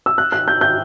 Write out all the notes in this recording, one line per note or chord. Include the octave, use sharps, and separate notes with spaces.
E6
F#6
F#6
G6
G6